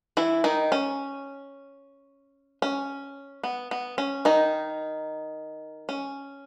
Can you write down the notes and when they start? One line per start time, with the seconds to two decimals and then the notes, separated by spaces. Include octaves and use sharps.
0.17 E3 E4
0.44 D#3 D#4
0.72 C#4
2.62 C#4
3.43 B3
3.71 B3
3.98 C#4
4.25 D#3 D#4
5.89 C#4